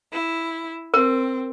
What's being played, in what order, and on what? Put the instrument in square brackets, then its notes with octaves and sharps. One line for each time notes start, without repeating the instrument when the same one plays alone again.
[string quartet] E4
[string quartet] C4 [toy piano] A#4